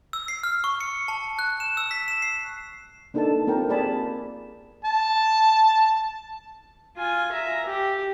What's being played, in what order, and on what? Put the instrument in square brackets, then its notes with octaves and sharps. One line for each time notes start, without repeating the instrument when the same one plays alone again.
[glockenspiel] E6
C7
F6
C#6
C#7
A5
F#6
E7
E6
B6
E7
C7
[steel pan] A#3 D4 D#4 A4 B4 A5
A#3 C4 F4 A#4 G5 A5
C4 G#4 D5 G#5 A5 B5
[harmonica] A5
[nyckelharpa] F4 G#5
E5 A#5
G4